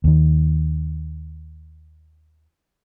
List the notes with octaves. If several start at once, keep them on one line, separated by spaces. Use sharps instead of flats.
D#2 D#3